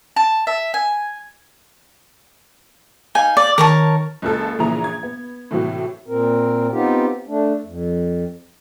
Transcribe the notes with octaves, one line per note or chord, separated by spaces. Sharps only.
A5
E5
G#5
D#4 F5 G#5
D5
D#3 A#4 C#5 A5
F#1 C#2 A4
A#1 A#2 C#3 E3 A#5 F7
G#6
B3
A2 C3 E3 F#3 A3 F#4
A#2 C4 A#4
B3 C4 D#4 F4 G4
A3 D4
F2